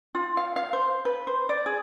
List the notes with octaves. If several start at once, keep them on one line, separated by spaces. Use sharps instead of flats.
F4
F5
F5
C5
B4
C5
D5
G#4